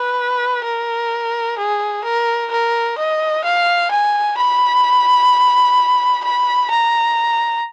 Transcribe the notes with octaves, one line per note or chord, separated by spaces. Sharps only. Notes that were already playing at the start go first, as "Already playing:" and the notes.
Already playing: B4
A#4
G#4
A#4
A#4
D#5
F5
G#5
B5
B5
A#5